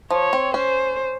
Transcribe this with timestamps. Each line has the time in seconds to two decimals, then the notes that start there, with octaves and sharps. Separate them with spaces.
0.11 F3 C#5
0.33 C4
0.54 C#4 C5